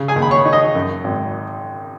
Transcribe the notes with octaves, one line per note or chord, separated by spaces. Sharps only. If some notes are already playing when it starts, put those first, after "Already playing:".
Already playing: C#3
G#4 G#5
D#2
B5
C#5 C#6
D#4
D#5 D#6
F#2
G#1